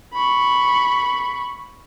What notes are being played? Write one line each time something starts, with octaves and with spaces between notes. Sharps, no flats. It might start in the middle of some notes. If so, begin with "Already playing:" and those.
B5 C#6